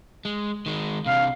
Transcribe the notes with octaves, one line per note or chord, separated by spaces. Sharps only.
G#3
D#3 G#3
C3 D4 F5